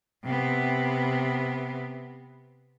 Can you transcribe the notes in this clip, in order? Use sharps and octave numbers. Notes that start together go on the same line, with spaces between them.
C3 B3